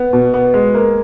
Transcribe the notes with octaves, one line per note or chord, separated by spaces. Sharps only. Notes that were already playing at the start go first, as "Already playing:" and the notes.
Already playing: B3
B2
B3
G#3
A#3